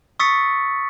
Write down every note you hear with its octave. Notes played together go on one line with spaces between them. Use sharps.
C#6 D#6 E6 A6 B6 C#7